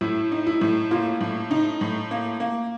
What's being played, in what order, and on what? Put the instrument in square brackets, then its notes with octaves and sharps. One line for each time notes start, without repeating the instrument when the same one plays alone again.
[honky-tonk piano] A2 [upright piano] E4
[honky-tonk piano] D#4
[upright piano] E4
[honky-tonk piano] A2
[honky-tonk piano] A#3 [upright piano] F4
[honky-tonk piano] A2
D#4
A2
A#3
A#3